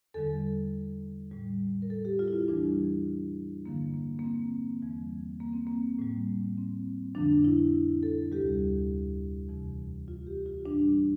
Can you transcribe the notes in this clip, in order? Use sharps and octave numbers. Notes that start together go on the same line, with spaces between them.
E2 D3 G3 A4
A2 G3
A#4
A4
G4
F4
E4
F4
E2 E3 G3 D4
G2 D3 F3 A#3
A#3
A#3
C4
E2 E3 G3
A#3
C4
A#3
A2 G3
C4
F2 D3 F3 D4
E4
A4
D2 C3 G3 G4
E2 C3 E3
F4
G4
F4
A2 E3 G3 D4